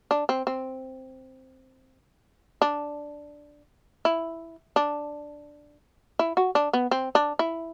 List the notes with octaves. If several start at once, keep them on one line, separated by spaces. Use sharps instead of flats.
D4
C4
C4
D4
E4
D4
E4
F#4
D4
B3
C4
D4
E4